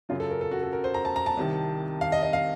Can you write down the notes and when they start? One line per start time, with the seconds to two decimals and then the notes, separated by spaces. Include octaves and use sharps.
0.09 F#2 C#3 F#3 F4
0.20 A4
0.30 A#4
0.41 A4
0.51 F#4
0.63 A4
0.73 A#4
0.84 C5
0.94 A#5
1.05 A5
1.16 A#5
1.26 A5
1.37 C2 C3 D#3
2.01 F5
2.12 D#5
2.23 D#5
2.33 F5